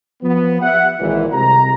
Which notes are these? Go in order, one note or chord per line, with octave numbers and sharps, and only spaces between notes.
F3 B3
G4 E5 F#5
G#1 A#2 E3
C2 C3 G#3 A#5